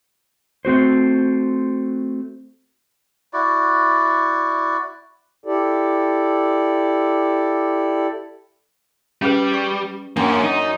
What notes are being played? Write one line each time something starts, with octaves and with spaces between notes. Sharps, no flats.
A3 C4 F#4 C5
E4 F#4 D5
E4 G4 A4 D5
G3 C#4 G#4 B4
D5 C#6
F#2 A#3 C#4 D4
D#4